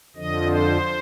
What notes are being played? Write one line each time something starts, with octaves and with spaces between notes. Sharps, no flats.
F2 D3 F3 D#5
C5